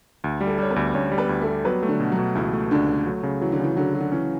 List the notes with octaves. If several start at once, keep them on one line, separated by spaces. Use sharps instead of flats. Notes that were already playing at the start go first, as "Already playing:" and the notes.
D2
G3
A3 A4
G3 C#5
B3 B4
D2
D2 C#4 C#5
G3
B3 B4
D2
A3 A4
G3
F#3 B3 B4
A3
D3 D4
B2
F#3 F#4
B2
C#2 E3 E4
A3
C#2 D3 D4
A3
F#3
C#3
E3 F#3
D3
C#3 E3
D3 F#3
F#3
D3
E3 C#4